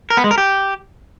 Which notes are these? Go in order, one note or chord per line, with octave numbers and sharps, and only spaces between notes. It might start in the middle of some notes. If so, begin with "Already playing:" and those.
A#4
B3
G#3
A#4
G4